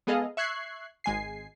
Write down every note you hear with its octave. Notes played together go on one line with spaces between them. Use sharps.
G#3 B3 G#4 A4 D#5 F5
E5 C#6 F#6 G#6 C7
G#1 G#3 G#5 C7